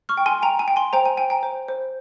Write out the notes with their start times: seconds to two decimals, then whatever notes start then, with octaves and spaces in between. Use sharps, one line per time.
0.09 C#6 F6
0.17 G5
0.26 G#5 C6
0.43 G5 A#5
0.59 G#5
0.68 G5
0.76 G#5 C6
0.93 C5 G5 A#5
1.06 G#5
1.17 G5 G#5
1.30 G5 A#5
1.43 C5
1.68 C5